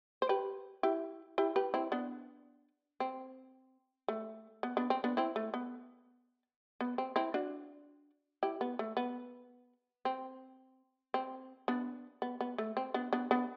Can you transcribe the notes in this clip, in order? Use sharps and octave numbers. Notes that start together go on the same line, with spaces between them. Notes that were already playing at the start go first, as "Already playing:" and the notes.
C5
G4 B4
E4 G4
E4 G4
G4 B4
C4 E4
B3 D4
C4
A3
B3
B3 D4
C4
B3 D4
C4 E4
A3
B3
B3
C4
C4 E4
D4 F#4
E4 G4
B3
A3
B3
C4
C4
B3 D4
B3
B3
A3
C4
B3 D4
B3 D4
B3 D4